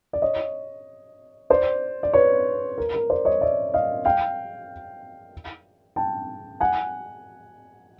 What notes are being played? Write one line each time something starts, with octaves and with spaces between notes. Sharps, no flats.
D5
C#5 D#5
C5 D5
D5
B4 C#5
A#4
A#4
C5 D5
C#5 D#5
D5 E5
D#5 F5
F5 G5
G5 A5
F#5 G#5